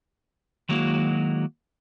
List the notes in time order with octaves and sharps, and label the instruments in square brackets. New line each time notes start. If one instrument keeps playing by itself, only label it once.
[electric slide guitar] D#3 F#3 G#3 A#3 E4 F#4